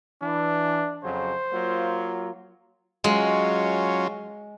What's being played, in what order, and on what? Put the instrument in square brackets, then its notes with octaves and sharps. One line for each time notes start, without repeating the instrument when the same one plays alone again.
[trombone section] E3 [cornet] D4
[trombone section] F2 C#3 F#3 [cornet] C5
[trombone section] F#3 A#3 F4
[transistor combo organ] F#3 C#4 F4 [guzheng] G#3